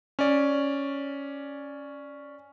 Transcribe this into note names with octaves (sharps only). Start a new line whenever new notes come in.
C#4 D5